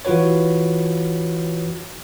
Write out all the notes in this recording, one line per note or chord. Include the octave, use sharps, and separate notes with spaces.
E3 F4 F#4 B4 C#5